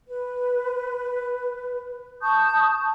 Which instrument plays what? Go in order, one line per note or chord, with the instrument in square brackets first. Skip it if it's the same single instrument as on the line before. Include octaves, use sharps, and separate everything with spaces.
[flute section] B4
A5 C#6 D#6 G6